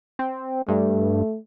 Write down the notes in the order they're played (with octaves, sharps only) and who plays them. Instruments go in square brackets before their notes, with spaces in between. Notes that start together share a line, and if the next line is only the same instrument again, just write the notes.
[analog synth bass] C4
[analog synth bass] G2 [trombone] A3